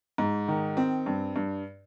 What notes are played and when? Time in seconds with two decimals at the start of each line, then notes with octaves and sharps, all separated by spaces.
0.18 G#2
0.48 D#3
0.77 C4
1.06 G2
1.36 G2